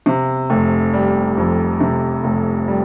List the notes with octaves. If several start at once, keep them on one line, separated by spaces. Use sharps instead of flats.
C3
F1
G3
F2
C3
F1
G3